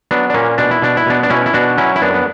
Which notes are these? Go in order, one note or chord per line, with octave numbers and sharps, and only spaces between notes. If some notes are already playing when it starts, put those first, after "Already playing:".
F#3 B3 D4
D4
A#2 A#3 C#4
B2 D4
E4
B2 D4
E4
B2 B3 D4
D4
B2 C#4 E4
E4
B2 D4 F#4
F#3 C#4 E4
E4
F#2 B3 D4
B3